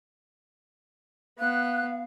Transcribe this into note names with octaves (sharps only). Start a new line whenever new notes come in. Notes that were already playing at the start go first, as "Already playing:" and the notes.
B3 F5 F#6